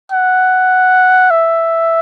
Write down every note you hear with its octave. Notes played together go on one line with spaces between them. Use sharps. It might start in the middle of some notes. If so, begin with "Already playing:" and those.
F#5
E5